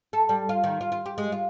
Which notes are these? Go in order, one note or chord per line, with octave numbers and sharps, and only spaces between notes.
A4
G3
F4
D#3
F4
F4
G4
G#3
F4